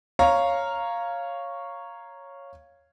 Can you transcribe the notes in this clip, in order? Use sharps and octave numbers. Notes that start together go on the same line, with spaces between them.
C#5 F5 A#5